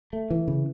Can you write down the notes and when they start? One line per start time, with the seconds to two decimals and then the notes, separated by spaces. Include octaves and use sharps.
0.13 A3
0.30 E3
0.48 C#3